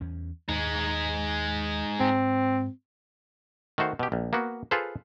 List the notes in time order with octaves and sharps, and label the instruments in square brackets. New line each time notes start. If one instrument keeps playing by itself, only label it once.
[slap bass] E2 C#4
[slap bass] D#2 [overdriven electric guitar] G#3 D#4
[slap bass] G#2 [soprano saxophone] C4
[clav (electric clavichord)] D#3 A3 F#4 C5
B2 G4
A#1
A#3 B3 F#4
F4 G#4 A4 B4 C5